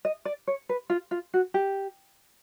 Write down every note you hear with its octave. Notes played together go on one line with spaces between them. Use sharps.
D#5
D5
C#5
B4
F4
F4
F#4
G4